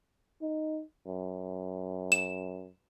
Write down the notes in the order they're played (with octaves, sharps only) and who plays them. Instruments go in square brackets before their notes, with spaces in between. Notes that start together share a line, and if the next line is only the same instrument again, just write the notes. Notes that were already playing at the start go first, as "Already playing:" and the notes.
[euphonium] D#4
F#2
[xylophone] E7